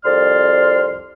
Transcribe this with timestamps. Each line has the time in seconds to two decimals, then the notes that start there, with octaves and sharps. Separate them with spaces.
0.05 C2 F2 D5 C6 F6